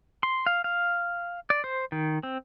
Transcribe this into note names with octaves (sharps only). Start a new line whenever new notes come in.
C6
F5
F5
D5
C5
D#3
C4